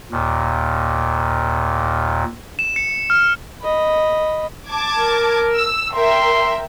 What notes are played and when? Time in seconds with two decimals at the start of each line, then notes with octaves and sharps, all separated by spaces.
0.12 D#2 A#2
2.59 E7
2.76 C#7
3.10 F6
3.62 D#5 B5
4.69 A5 D6 G#6
4.98 A#4
5.56 E6
5.95 A#4 E5 G5 C6